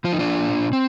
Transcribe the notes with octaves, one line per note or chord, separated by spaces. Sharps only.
F3 F4
D#4
D4 F4
A#2
C4